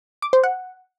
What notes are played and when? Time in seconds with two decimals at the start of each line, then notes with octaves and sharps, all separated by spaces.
0.22 D6
0.33 C5
0.44 F#5